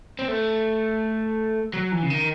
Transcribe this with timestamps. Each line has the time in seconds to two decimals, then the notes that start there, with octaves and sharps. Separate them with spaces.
0.19 C4
0.28 A3
1.74 F#3
1.92 E3
2.03 C#3
2.10 D#3